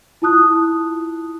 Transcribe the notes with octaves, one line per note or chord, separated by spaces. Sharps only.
E4 F4 A5 D#6 F#6